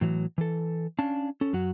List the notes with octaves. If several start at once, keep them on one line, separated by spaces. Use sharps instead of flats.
A2 E3 F#3
E3 A4
C#4 D4 F5 A5
C#4 A4
F#2 F#3 F#4